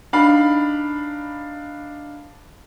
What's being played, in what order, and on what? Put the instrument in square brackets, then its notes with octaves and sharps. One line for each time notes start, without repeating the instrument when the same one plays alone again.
[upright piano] D4 D#4 F5 B5